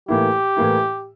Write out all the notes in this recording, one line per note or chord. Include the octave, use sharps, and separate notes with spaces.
A2 E3 A#3 E4 G4
A2 E3 A#3 E4